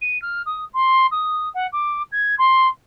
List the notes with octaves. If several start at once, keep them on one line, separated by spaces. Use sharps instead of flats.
D#7
F6
D#6
C6
D#6
F#5
D6
G#6
C6